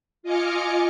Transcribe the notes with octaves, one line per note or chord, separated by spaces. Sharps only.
F4 D#5 G#5 D6 F6 C#7